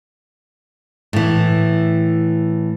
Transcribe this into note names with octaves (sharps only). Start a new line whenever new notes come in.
A2 E3